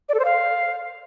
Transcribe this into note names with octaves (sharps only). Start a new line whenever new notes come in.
D5
A4
C5
F5